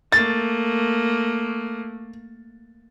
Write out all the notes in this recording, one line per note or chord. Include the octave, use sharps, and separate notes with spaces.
A3 A#3 A6